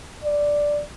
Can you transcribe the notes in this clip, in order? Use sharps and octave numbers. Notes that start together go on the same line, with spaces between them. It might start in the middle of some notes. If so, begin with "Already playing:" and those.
D5